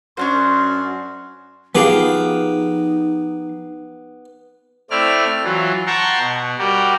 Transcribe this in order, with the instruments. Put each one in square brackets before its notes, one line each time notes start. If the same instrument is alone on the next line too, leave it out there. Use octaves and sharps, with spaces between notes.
[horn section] F#2 F#4 C6 [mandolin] C#4 D4 C5
[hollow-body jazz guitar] F3 G#4 F5 [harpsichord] B3 G4 [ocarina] D#4
[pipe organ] A3 C4 E4 D5 F6
E3 F#3 F4
F#5 G5 A5 A#5 C6 C#6
B2
G3 F#4 G4 A#4